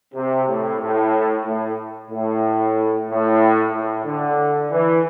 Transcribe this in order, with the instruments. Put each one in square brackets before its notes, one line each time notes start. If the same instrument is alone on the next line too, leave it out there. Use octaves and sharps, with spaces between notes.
[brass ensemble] C3
A2
A2
A2
A2
A2
A2
D3
E3